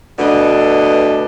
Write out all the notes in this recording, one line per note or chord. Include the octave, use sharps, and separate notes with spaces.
D2 B2 D3 B4 D#5